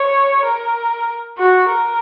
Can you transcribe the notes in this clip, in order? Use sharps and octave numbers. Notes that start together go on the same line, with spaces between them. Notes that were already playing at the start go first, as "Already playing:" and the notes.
Already playing: C#5
A#4
F#4
A#4